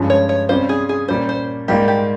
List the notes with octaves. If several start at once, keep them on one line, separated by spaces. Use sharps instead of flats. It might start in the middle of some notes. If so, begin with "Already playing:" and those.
Already playing: G2 F3 G#3 C#4
C#5
C#5
C3 G3 C#4 F4 C5
G#4
G#4
A#2 G3 A#3 C#4 C5
C5
G#2 G3 A#3 F4 G4
G4